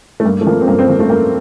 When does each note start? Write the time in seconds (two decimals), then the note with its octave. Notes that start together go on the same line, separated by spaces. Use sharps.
0.20 A3
0.25 G2 A#3
0.41 A3
0.47 F3 A#3
0.61 C4
0.67 G2 A#3
0.79 C4
0.88 F3 A#3
0.99 A3
1.10 G2 A#3